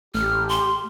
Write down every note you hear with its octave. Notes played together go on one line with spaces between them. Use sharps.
A1 A3 G4 F6
C6